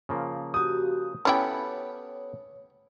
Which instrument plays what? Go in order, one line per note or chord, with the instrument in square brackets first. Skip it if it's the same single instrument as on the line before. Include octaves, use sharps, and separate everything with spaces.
[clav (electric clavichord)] C#3 F3 A#3
[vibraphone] F#4 G4 [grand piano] D#6
[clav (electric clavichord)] B3 G4 A4 [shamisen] C#4 E4 G5 [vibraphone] C#5